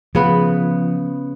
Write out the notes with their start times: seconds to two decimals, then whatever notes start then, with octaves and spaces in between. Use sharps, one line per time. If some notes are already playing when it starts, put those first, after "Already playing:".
0.15 C#3 F3 B3 B4